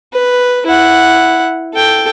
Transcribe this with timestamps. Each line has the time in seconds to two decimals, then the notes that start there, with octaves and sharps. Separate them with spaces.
0.13 B4
0.66 E4 F#5
1.74 A4 G5